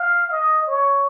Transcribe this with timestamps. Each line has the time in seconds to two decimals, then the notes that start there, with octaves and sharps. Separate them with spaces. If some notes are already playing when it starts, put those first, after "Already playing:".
Already playing: F5
0.31 D#5
0.67 C#5